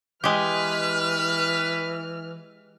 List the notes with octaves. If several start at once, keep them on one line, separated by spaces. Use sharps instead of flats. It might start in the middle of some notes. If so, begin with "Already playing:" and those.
E3 G#3 G4 B4 F6